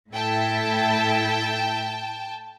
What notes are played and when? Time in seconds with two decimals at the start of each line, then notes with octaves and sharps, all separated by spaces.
0.12 A2 E4 A4 G5 A5